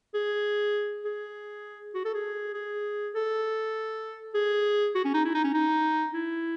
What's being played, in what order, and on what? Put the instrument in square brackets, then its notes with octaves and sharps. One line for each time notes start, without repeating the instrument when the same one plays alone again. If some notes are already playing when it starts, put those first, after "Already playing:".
[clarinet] G#4
G#4
F#4
A4
G#4
G#4
A4
G#4
F#4
C#4
D#4
E4
D#4
C#4
D#4
E4